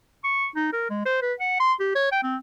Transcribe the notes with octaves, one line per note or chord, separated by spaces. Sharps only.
C#6
D#4
A#4
G#3
C5
B4
F#5
C6
G4
C#5
G5
C4